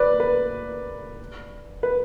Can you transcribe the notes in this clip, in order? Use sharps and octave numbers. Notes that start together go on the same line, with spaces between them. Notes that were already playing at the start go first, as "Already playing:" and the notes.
Already playing: B4 D5
B4
B4